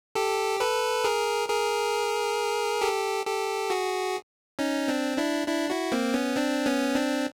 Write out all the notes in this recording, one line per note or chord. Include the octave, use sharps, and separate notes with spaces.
G4 A4
A4 B4
G#4 A#4
G#4 A#4
G4 A4
G4 A4
F#4 G#4
C#4 D#4
C4 D4
D4 E4
D4 E4
E4 F#4
A#3 C4
B3 C#4
C4 D4
B3 C#4
C4 D4